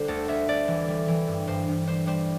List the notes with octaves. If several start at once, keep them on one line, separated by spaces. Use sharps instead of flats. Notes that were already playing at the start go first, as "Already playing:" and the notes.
Already playing: D3 G3 C5
D2 A4
D2 E5
D2 D5
E3
G3
E3
G2
G2 C5
G2
G3 C5
G3 C5